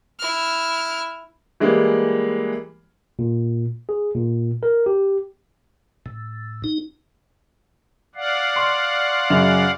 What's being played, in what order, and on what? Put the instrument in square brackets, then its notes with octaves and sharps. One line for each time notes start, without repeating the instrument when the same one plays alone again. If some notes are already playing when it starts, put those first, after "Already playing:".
[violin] E4 F6
[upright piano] E3 G3 G#3 A#3
[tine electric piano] A#2
G#4
A#2
A#4
G4
[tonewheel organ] A2
D#4
[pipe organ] D5 F5 F#5
[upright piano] C6 C#6
F#2 C#3 F7